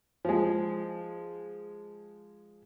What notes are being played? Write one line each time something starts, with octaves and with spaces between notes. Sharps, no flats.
F3 G#3